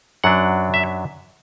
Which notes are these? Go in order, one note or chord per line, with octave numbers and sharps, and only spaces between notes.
F#2 F#3 D4 F#5
E5